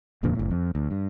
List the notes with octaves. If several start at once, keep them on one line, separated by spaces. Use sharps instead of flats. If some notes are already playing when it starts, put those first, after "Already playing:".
E1 F2 A#2 D3
F#1 A2
F2
D2
G2